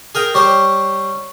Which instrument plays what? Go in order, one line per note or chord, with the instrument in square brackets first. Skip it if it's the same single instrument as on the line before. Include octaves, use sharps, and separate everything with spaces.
[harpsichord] G#4 A#4 G5
[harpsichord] G3 G4 C5 [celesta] C#5 C#6